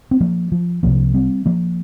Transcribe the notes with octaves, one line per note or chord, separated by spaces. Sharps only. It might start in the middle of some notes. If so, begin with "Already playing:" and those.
C4
F3 A#3
F3
C2 C3 F3 A#3
G3 C4
F3 A#3